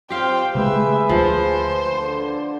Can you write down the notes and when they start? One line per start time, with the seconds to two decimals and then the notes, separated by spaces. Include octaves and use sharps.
0.10 C4 F4 G4 C5 F5 G5
0.55 C#3 G#3 A3 G#4 B4 E5
1.09 D2 F3 C5
1.92 D3